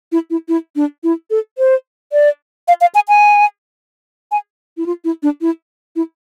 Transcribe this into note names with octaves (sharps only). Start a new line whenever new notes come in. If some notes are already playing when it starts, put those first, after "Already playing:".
E4
E4
E4
D4
E4
A4
C5
D5
F5
F5
G#5
G#5
G#5
E4
F4
E4
D4
E4
E4